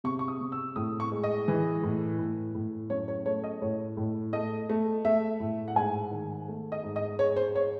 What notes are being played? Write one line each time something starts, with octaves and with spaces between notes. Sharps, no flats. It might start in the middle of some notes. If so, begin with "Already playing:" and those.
C3 C#6
C#6
D#6
C3
E6
A2 D#6
C#6
G#3
D#5
E3
A2
A2
A2
F#2 C#5
C#5
A3 C#5
D#5
A2 C#5
A2
A3 D#5
A3
A3 E5
A2
F#5
G#2 G#5
D#3
A3
D#5
G#2
D#5
G#3 C#5
C5
C#5